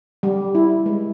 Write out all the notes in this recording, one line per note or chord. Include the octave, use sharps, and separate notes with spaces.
G3
E4
G#3